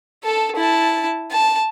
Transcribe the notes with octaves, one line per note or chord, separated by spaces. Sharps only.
A4 A5
E4 A5
A5